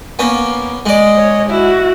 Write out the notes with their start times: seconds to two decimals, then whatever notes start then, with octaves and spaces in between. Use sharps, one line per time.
0.19 A#3 B3 C#4
0.86 G#3 D5 D#5
1.16 C#5
1.49 E4 F#4